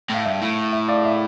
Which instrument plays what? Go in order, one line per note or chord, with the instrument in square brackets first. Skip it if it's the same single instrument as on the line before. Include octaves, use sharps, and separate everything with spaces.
[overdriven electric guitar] A2 [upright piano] F5
[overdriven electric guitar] G2 [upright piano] E5
[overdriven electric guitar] A2
[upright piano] E5
D5 F5
E5